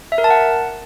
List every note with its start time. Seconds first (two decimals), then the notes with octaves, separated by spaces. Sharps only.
0.12 E5
0.18 A#4
0.24 A5
0.30 F#5